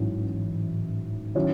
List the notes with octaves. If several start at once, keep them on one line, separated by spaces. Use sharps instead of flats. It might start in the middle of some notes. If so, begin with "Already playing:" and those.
Already playing: A1 G#2 F#3 C#4 E4
D#3 F#3 C#4 E4